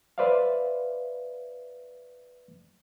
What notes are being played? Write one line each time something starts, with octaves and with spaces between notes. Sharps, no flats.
B4 C5 D5 E5 F5